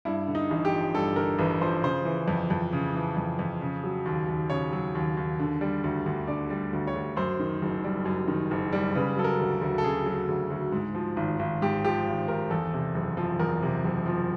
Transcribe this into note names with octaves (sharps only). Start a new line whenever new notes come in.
G2 E4
D3
D#4
A1
G4
F3
G2 A4
D3 A#4
A1 B4
F3 C5
C#3 C5
E3
F2
F2
C#3
E3
F2
F2
C#3
F#3
D#2
D#2
C#3 C#5
F#3
D#2
D#2
D3
G3
D2
D2
D3 D5
G3
D2
C#5
D2
F#2 C5
D#3
F#1
G3
F#2
D#3
F#1
G3
C#3 B4
F#3 A4
A#4
D2
D2
A4
C#3 G#4
F#3
D2
D2
G#2
F3
G#1
G#1
G#2 G4
F3 G4
G#1
G#1 A#4
E2 A4
C3
F#1
F3
E2 A#4
C3
F#1
F3